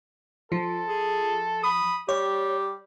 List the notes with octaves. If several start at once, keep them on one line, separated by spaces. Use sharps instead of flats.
F3 A4
G#4
B5 D#6
G3 G4 C#5